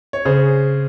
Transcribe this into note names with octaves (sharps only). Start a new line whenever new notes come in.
C#5
C#3 G#4 C5